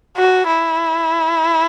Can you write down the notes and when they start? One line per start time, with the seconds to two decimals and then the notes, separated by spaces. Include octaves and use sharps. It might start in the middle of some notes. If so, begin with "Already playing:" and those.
0.17 F#4
0.47 E4